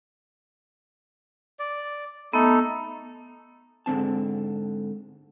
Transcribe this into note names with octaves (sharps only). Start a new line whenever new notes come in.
D5
A3 B3 D#4 A4
G#2 D3 F3 C4 A5